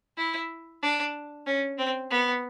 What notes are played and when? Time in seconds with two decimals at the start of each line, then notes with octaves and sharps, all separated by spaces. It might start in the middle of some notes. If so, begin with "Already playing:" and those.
0.17 E4
0.82 D4
1.46 C#4
1.78 C4
2.11 B3